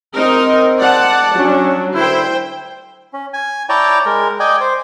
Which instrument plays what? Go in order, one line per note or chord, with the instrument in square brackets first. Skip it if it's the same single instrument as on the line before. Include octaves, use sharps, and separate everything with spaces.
[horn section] C4 [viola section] D#4 A#4 D#5
[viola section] D5 F#5 A5
[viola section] F#3 [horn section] C#4 D4
[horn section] D3 E4 [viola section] C5 G5
[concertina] C#4
G#5
E4 C#5 D5 G5 A5 A#5
G#3 A#4
D5 D#5 G5 G#5
C5